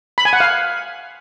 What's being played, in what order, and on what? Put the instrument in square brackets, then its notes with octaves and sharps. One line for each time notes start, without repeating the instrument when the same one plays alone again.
[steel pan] B5
G#5
F#5
F5